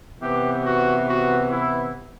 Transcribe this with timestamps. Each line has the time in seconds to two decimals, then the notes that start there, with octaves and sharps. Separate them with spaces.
0.22 C3 E3 B3 G4
0.65 F#4
1.09 F#4
1.51 E4